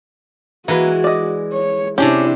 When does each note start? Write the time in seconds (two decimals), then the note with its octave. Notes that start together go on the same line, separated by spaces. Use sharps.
0.68 E3 G#3 A#3 F#4 B4
1.04 D5 D#5
1.53 C#5
1.98 C3 C#4 D4 E4 G4